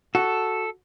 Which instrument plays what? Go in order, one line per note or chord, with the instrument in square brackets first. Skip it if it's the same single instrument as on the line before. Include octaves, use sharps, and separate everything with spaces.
[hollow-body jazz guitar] F#4 [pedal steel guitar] A4